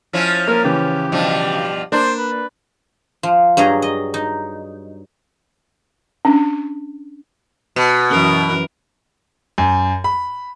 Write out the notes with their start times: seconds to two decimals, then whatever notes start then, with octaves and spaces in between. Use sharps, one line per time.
0.13 F3 C#4 E4
0.48 A#3 A#4
0.64 C#3 E3 G4
1.12 G2 B2 F3
1.92 A#3 D4 C5
2.18 B4
3.23 F3
3.57 G2 F#3 G#4 D#5 A#5
3.82 D#5
4.14 D#4
6.25 C#4 D4
7.76 B2
8.10 F#2 E3 A#4
9.58 F#2
10.04 B5